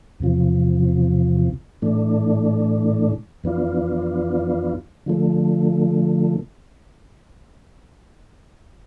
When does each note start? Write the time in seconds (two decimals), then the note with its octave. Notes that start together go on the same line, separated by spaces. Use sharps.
0.20 E2 C3 F3
1.82 A2 E3 A3 D4
3.44 F2 E3 B3 D4 F4
5.06 D3 F3 A3